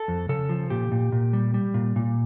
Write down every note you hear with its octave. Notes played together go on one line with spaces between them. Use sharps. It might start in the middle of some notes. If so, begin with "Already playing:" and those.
Already playing: A4
F2
C#3 A4
F3
A#2 G4
A#2
A#2
G3
G3
A#2
A#2